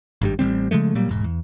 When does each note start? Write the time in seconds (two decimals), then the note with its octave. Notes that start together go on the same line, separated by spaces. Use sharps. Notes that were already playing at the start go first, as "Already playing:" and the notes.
0.22 G#1 G2 G3
0.39 A1 E3 G3 C4
0.71 C#3 F3 G#3 A3
0.95 A#2 F#3 G3 A#3
1.09 E1 G#2
1.24 E2